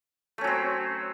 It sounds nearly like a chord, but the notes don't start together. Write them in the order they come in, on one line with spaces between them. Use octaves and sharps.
A3 C#4 F#3 C4